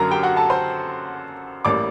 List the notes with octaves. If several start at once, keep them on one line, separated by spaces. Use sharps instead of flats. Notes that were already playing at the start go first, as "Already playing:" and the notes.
Already playing: F#2 D3 F#3 A#3 A#4 A#5
G4 G5
F#4 F#5
A4 A5
C5 C6
A1 A2 G3 A#3 D5 D6